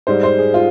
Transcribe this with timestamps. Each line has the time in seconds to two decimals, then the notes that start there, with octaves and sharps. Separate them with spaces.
0.07 G#2 G3 C5
0.23 C5
0.38 G#4
0.54 F4